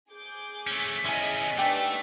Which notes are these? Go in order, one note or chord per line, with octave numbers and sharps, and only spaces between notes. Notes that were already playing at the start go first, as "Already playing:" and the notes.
G#4 D6 G6
A3 C#4
B3 C#4 E4 G#4 D#5 G#5
A3 D4 D#4 G4 B4 F#5